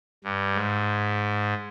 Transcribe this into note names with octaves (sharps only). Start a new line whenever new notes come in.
G2
G#2